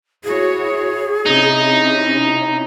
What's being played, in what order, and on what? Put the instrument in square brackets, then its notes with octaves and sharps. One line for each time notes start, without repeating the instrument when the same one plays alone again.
[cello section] E4 F#4 C#5 [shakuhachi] G#4
[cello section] C3 C#4 E4 [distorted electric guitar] D#4